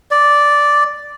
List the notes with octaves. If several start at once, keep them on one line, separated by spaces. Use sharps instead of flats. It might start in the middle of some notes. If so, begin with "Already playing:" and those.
D5